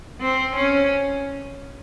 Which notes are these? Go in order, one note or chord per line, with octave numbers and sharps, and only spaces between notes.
C4
C#4